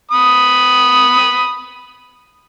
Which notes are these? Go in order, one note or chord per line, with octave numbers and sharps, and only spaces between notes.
B5 D#6